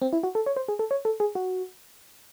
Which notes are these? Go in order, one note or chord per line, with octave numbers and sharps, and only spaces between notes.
C4
E4
F#4
A4
C#5
C5
G#4
A4
C#5
A4
G#4
F#4